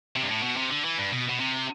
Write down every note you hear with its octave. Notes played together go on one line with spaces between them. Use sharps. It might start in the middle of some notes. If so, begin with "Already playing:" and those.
C3
G2
A2
B2
C3
D3
E3
G2
B2
B2
C3